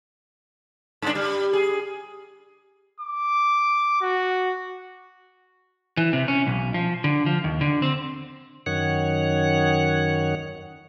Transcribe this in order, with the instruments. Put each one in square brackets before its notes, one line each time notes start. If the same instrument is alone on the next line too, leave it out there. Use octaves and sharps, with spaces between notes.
[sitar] G2 D4
G3
G#4
[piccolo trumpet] D6
F#4
[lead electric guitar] E3
C3
C#4
B1
F3
D3
F3
D#2
D3
C4
[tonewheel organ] F#2 D#3 C#5 F#5